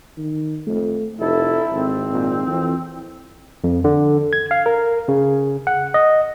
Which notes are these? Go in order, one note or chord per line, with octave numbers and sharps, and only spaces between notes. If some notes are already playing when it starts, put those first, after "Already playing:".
D#3
F2 A3
F1 E4 A4
G#1 C4
A#2
F2 E3
F2
D3
G#6
F5
A#4
C#3
F#5
D#5